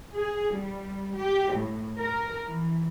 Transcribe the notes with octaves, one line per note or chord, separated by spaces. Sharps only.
G#4
G3
G4
A2
A#4
E3